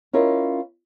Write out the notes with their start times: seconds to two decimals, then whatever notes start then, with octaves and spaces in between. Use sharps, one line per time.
0.13 C#4 E4 F4 A#4 D#5